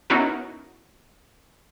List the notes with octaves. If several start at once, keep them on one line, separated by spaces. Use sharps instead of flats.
B3 C#4 D#4 E4 F#4 A#4